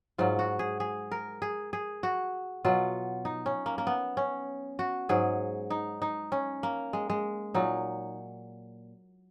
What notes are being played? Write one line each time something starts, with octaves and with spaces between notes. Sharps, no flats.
G#2 F#3 F4
F#4
G#4
G#4
A#4
G#4
G#4
F#4
B2 F#3 F4
D#4
C#4
A#3
A#3
B3
C#4
F#4
G#2 F#3 G#4
D#4
D#4
C#4
A#3
G#3
G#3
A#2 F#3 D#4